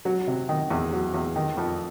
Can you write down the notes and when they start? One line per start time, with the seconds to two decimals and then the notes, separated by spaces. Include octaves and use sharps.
0.05 F#3
0.27 C3
0.49 D#3
0.70 E2
0.93 F#3
1.14 E2
1.36 D#3
1.57 F2